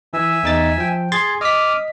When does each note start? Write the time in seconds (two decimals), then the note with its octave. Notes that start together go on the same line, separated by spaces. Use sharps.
0.13 E3 E5 G#5 E6
0.43 E2 D#4 A6
0.78 F3 G5
1.12 G#4 C6 G#6 A6
1.41 D#5 D6 D#6 F6 B6